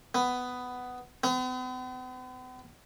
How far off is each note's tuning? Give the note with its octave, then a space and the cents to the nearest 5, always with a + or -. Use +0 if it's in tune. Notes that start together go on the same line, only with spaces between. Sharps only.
B3 +10
B3 +45